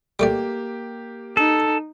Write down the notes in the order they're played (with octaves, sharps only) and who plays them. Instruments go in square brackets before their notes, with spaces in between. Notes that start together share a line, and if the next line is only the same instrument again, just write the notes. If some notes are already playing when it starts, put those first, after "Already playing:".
[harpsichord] G3 A3 D5 [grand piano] A#3 G4
[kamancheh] D#4 [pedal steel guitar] A4